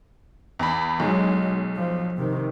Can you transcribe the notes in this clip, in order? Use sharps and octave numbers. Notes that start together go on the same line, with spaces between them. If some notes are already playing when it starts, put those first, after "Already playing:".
E2 B5
B1 F#3 G#3
F3
C3 D#3